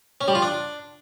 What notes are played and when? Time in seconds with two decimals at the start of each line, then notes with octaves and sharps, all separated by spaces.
0.21 C#4
0.28 G3
0.35 F4
0.42 D4